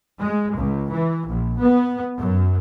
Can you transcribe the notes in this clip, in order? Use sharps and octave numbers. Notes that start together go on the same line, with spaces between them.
G#3
C#2
E3
A#1
B3
F#2